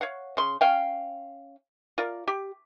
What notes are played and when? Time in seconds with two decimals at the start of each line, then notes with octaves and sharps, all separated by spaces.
0.01 C#5 F5 F#5
0.37 C#3 C6
0.61 C#4 F5 G5
1.98 F4 A#4 D5
2.28 G4